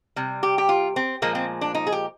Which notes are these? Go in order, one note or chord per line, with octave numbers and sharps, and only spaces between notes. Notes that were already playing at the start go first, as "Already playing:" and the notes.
C3 G3
G4
G4
F4
C4
A#2 F3 G#3 A#3
C4
D4
D#4
G#4
G4